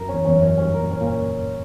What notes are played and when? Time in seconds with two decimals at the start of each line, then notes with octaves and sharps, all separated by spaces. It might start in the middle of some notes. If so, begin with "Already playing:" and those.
Already playing: F#2 A#4
0.09 C#4
0.14 E2
0.25 E2 C#4
0.36 F#2
0.42 C#4
0.58 G2 C#4
0.74 A#4
0.80 A#2
0.91 C#4
1.01 A#2
1.07 C#4